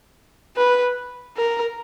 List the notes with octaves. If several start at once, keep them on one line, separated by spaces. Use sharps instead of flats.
B4
A#4